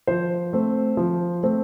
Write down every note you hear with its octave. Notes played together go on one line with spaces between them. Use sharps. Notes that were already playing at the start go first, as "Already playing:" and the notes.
F3 C5
A3 C4
F3
A3 C4